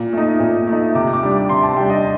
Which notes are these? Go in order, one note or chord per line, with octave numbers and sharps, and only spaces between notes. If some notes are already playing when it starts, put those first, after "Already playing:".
Already playing: A#2
A3 D#4
A#2
A3 D#4
C3 D6
D6
G3 D4
D6
C3 C6
A5
G3 D4 G5
D#5